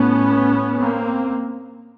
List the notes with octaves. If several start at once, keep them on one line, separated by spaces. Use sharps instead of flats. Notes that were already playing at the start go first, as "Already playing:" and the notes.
Already playing: A2 B3 C#4
A#3 C4